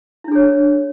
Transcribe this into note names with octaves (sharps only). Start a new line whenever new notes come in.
D4 E4 G#4 C#5